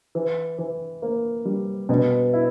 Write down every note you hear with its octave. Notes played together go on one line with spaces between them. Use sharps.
E3
E3
A#3
G3
B2
E4